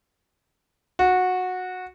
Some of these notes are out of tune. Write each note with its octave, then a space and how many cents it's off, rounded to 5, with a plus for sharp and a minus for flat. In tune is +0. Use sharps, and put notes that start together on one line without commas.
F#4 -15